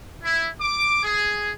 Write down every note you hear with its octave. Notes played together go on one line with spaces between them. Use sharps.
E4
D6
G#4